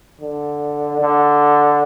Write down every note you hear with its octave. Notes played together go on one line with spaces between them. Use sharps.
D3
D3